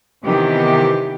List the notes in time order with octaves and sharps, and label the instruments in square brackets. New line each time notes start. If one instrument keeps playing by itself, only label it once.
[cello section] C3 D#3 E3 B3 G4